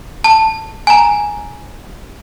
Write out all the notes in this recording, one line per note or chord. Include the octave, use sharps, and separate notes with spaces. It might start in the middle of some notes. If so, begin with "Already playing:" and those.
A5
G#5 A#5